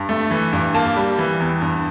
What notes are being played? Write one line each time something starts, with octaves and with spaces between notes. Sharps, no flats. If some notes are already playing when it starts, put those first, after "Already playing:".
Already playing: G2
A3
E3
G2
A#3 A5
G3
E3
E2
G2